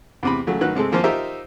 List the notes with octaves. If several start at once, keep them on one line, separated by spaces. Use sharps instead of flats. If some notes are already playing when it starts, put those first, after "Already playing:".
E2 C3 B5
C#3 F#3 A3
D#3 F#3 B4 F#6
C3 G#3 C4 A4
E3 F3 A#3 F4 C5
D#4 F4 G4 A#4 C5 E5